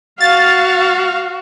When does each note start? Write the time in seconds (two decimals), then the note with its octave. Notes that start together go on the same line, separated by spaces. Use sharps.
0.21 F#4 F5 A6